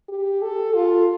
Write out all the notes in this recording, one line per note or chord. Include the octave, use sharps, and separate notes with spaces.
G4
A4
F4